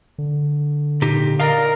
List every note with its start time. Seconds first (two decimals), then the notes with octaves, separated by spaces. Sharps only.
0.18 D3
1.02 A#2 D#4 G4
1.40 A#4 D5 D#5 F5